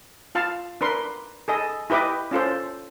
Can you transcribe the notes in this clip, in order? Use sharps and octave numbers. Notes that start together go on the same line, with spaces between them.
F4 F5 A5
D4 A#4 B4 C6
G#4 A4 D#5
E4 G4 B4 D#5 D6
C#4 F4 A4 C5